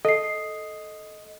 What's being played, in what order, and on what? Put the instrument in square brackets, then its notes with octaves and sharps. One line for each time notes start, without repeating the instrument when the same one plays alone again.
[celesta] A4 C7 [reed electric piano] D#5